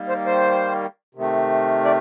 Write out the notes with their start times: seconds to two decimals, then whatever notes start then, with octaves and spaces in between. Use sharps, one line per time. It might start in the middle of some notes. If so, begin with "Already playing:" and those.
Already playing: D#3 G3 A#3
0.08 C5
0.26 C5
1.15 C3 D#3 A3
1.85 D5